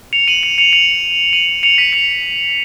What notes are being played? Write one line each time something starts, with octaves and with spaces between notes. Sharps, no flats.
C#7 F7
D#7 F#7
C#7 F7
C#7 F7
C#7 F7
D#7 F#7
C#7 F7
B6 D#7
C#7 F7